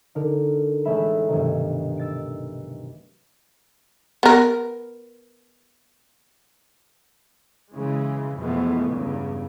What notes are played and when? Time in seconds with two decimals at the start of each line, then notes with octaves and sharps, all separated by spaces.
0.15 D3 D#4 A#4
0.85 A1 G#3 A3 E5 B5 E7
1.29 B1 G2 C3 D#3
1.98 E6 A6 D7
4.23 B3 A#4
7.73 C#3 E3 G#3
8.37 F2 B2 E3 G#3 A3 B3
8.88 E2 G2 C#3